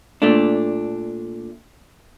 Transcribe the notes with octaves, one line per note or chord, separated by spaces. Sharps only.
A#2 A3 D4